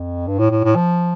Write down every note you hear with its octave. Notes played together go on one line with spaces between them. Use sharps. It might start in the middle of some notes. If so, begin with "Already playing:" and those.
Already playing: F2
G2
A2
A2
A2
F3